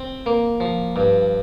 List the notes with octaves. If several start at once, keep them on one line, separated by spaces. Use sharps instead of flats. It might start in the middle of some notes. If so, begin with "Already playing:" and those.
Already playing: C4
A#3
F3
G2